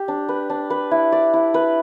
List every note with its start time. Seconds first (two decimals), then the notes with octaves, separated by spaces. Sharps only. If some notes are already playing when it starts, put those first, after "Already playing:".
Already playing: G4
0.08 D4
0.29 B4
0.50 D4
0.70 B4
0.91 E4
1.12 D5
1.34 E4
1.54 B4